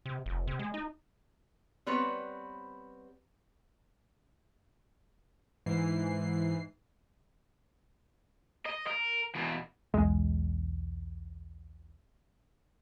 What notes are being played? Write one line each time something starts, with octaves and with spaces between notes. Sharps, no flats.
C3
F1
C3
G#3
D#4
G3 B3 C4 B4 C#5
G#2 E3 C7
D#5
A#4
E2 B2
B1 E2 G#3